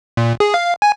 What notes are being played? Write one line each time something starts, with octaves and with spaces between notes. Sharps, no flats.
A#2
G#4
F5
G#5